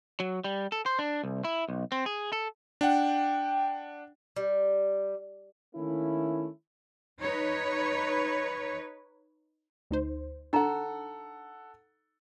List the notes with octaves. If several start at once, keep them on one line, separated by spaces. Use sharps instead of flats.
F#3
G3
A4
C5
D4
C2
E4
B1
C4
G#4
A4
D4 F#5 G5
G3
D#3 A3 A#3 C#4 E4
D#4 B4 C#5
D2 D#4 C5
D4 D#4 A4 F#5 A#5